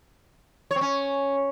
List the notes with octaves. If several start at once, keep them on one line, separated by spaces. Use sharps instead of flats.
C#5
C4
C#4